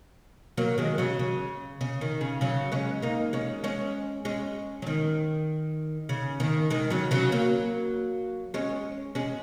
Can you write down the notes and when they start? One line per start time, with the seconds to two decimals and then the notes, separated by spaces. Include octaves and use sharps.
0.57 F#3 A#3
0.78 D#3 G#3
0.98 C#3 F#3
1.19 C#3
1.81 C#3
2.01 D#3
2.21 C#3
2.41 C#3 F#3
2.72 G#3 C#4
3.02 A#3 D#4
3.33 G#3 C#4
3.64 G#3 C#4
4.25 G#3 C#4
4.82 F#3
4.87 D#3
6.09 C#3
6.40 D#3
6.70 D#3 G#3
6.90 C#3 F#3
7.11 C#3 F#3
7.32 F#3 A#3
8.54 G#3 C#4
9.15 G#3 C#4